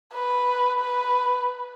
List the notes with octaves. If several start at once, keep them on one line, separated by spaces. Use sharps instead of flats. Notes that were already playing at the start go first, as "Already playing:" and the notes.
B4
B4